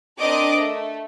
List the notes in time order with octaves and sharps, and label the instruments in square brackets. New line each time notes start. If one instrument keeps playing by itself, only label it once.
[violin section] C4 D4 A#4 D5 D#5 D6
A3